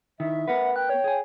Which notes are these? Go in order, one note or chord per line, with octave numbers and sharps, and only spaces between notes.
D#3 E4 E5
B3 A#4 B4 F#5
G5 F#6
C#5
G#4 G#5